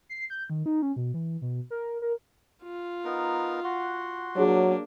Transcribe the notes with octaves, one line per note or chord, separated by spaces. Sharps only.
C7
G6
D#3
D#4
C#4
B2
E3
B2
A#4
A#4
F4
B3 D#4 A#4
F#4 F#5 C6
F#3 A#3 D4 G#4 C#5